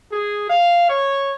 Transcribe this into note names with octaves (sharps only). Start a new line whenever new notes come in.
G#4
F5
C#5